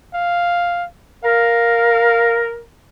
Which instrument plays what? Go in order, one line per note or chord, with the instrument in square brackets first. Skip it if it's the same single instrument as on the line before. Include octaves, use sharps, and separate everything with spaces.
[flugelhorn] F5
[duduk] A#4 [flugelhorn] F5